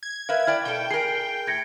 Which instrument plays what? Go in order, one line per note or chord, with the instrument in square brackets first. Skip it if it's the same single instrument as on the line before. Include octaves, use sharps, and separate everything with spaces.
[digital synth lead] G#6
[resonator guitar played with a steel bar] A#4 B4 E5 [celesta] F5
[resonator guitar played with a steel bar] E4 D5 G5 [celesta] F6
[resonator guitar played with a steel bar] B2 A4 [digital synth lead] G5
[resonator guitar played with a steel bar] G#4 A#4 [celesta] C7
[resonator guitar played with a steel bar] A2 [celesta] G#6 A#6 C#7